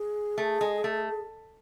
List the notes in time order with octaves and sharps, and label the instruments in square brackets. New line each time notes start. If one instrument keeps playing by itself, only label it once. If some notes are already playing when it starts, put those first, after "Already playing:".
Already playing: [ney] G#4
[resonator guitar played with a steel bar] A3
G#3
A3